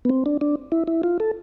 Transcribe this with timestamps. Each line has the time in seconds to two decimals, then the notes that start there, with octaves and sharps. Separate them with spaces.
0.05 B3
0.09 C4
0.26 D4
0.41 D4
0.72 E4
0.87 E4
1.03 F4
1.20 A4